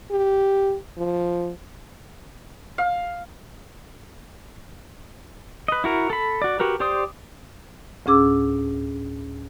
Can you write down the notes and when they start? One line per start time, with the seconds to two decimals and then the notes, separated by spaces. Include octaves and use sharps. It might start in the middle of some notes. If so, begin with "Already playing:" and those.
0.11 G4
0.98 F3
2.78 F5
5.68 B4 D#5
5.84 E4 F#4 A#4
6.10 A4 B5
6.42 F#4 D5
6.59 F#4 G4 A#4 B4
6.80 G4 C5 D5 C6 D#6
8.06 D2 A2 C#4 G#4 D6 E6